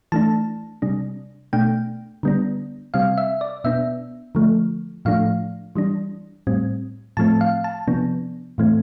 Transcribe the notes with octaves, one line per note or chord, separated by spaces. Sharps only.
E3 A3 D4 A5
C3 G3 D4
B2 A3 D4 G5
D3 G3 B3 D4
C3 G3 C4 F5
E5
D5
B2 B3 D4 E5
D3 F3 A3
A2 F3 A3 D4 F5
E3 G3 D4
A2 G3 C4
A2 F3 A3 C4 A5
F5
A5
C3 F3 B3 D4
A2 E3 A3 C4